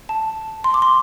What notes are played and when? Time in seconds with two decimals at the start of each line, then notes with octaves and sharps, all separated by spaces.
0.09 A5
0.64 C6
0.74 D6
0.82 C6